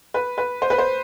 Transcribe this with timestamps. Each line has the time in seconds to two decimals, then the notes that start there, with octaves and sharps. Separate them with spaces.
0.14 B4
0.38 B4
0.62 C5
0.70 B4
0.78 C5